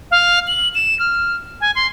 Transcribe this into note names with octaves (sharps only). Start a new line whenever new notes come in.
F5
F#7
E7
F6
G#5
C6